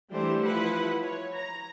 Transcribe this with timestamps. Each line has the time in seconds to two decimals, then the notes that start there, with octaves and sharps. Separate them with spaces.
0.12 E3 G3 A3 D4 G4 C5
0.42 F3 E4 B4 F#5
1.03 C#5
1.34 A#5